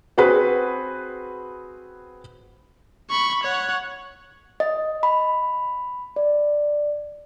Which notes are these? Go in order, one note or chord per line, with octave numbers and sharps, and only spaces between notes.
C4 F#4 G#4 B4
B5 C#6
C#5 F#5
D#5
B5
D5